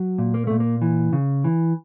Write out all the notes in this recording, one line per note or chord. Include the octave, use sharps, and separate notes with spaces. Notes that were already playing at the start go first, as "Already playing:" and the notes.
Already playing: F#3
A#2
A#3
A#2 A3
A#3
E3
C#3
E3